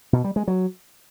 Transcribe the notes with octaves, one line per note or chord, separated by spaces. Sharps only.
B2
G3
G#3
F#3